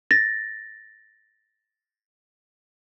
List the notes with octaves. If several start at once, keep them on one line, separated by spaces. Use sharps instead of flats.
A6 A#6